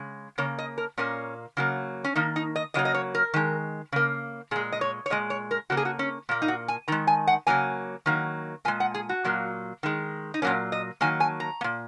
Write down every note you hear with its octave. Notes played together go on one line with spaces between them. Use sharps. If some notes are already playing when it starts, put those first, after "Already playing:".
Already playing: C#3 G#3
C#3 A#3 C#5
D#5
A#4
A#2 A#3 C#4
C#3 F#3 A#3
C#4
D#3 A#3 D#4
D#4
D#5
C#3 F#3 A#3 D#5
D#5
C#5
A#4
D#3 G#3
C#3 A#3
A#2 G#3 G#4
D#5
C#5
C#5
A#2 G#3 D#5
C#5
A#4
C#3 A#3 F#4
G#4
F#4
C#4
A#2 A#3
D#4
F#4
G#5
D#3 G#3 A#5
G#5
F#5
C#3 F#3 A#3 G#5
D#3 F#3 A#3
A#2 G#3 G#5
F#5
G#4
F#4
A#2 F#3 A#3
D#3 G#3
D#4
A#2 F#3 A#3 C#4
D#5
D#3 F#3 A#3 G#5
G#5
A#5
A#3
A#2